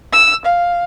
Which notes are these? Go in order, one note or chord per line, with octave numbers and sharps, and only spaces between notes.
E6
F5